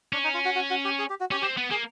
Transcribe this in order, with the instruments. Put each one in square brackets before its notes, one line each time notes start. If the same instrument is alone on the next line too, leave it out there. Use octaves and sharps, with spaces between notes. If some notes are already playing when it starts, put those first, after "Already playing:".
[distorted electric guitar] C#4 [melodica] D4
[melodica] D#4
F4
F#4
F#4
F#4
G4
G#4
G4
F#4
[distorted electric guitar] C#4 [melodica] G4
[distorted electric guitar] C4 [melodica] G4
[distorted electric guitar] B3
[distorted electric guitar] A#3 [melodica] G#4